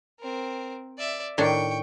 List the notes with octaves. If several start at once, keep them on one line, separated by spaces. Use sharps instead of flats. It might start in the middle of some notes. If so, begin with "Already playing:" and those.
C4 A#4
D5 E5
A2 D#3 D4 G5 C#6